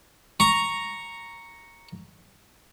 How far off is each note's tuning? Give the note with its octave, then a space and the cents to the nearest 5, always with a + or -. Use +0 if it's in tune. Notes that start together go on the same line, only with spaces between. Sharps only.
A#5 +0 C#6 +0